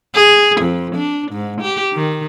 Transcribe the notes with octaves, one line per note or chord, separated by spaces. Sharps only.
G#4
F2
D4
G#2
G4
D#3